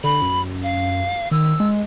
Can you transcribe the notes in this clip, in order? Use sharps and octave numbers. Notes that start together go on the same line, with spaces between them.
D3 B5
F#2
F5
D#3 E6
G#3